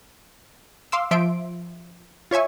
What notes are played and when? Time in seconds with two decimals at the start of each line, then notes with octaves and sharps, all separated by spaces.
0.92 F5 C6 D6 E6
1.11 F3 E5 C6 D7
2.31 F4 C#5 E5 G#5 C#6